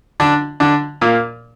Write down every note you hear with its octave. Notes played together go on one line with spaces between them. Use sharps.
D3 D4
D3 D4
A#2 A#3